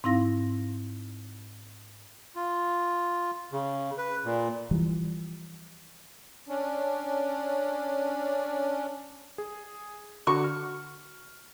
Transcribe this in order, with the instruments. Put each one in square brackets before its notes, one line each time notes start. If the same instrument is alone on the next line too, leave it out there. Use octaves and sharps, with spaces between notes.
[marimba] G#2 C4 D#4 E4 F5 A#6
[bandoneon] F4
C#3
B4
A#2
[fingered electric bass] E3 F3 G3
[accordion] C#4 D4
[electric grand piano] G#4
[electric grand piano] D3 F#4 [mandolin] C#6
[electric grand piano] F6